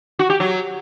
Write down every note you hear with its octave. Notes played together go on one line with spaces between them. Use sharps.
F#4
G4
F#3